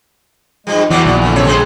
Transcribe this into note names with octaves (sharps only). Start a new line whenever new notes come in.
G2 F3 G3 G#3
E2 E3 G3 B3 C4 F#4 D5
A#1 D#3
D3 E3
C3 C4 C#5
G3 G#3 G#4 C5 C6